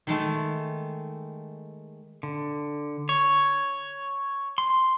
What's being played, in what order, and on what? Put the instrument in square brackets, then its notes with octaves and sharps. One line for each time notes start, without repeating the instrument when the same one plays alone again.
[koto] D#3 G#3 A3
[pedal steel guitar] D3
C#5
C6